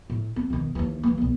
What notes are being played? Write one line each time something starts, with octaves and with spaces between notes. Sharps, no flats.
A2
C4
E1 D#3
D#2 E3
E3 A#3
B1 E2